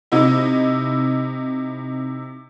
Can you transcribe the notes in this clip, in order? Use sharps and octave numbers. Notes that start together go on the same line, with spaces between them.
C3 D#4 E4